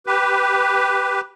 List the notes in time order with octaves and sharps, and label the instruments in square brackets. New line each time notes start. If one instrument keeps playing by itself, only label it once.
[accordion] G4 B4